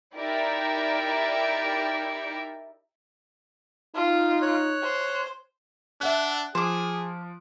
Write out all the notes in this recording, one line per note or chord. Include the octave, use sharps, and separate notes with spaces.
D#4 E4 G4 A#4 D5 E5
D#4 F4
C#5 F#6
C5
D4 E5 F#5 F#6
F3 G#4 C5 D6